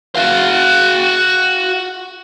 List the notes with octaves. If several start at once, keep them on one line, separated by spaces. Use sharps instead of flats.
F#4 F5